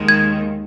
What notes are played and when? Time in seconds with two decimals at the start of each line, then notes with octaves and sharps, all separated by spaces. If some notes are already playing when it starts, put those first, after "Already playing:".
Already playing: D#2 D#3 G#3
0.08 G#6